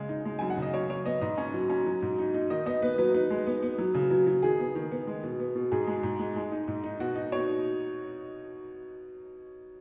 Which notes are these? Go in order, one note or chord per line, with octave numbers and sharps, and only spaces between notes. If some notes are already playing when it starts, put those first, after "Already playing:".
Already playing: C#3 G#3
D#4
G#3
F#2 G#5
F#5
C#3 D#5
F#2 C#5
F#2 C#5
B3 D#5
G#2 D#5
C#4
F#3
C#4
F#3
G#2
D#4
D#4
D#3 D#5
B3 D#5
B3 B4
F#3 B4
D#4 B4
G#3
B3
B3
F#3
C#3
F#3
F#3
D#3 G#4
B3
D#3
B3
G#3
B2
B3
B2
G#2 G#4
G#3
G#2
G#3
G#3
D#4
G#2
D#4
B2 F#4
D#4
B2 C#5